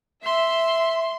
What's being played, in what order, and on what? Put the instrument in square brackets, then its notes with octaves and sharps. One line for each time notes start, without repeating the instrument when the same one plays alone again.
[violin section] E5 [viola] C6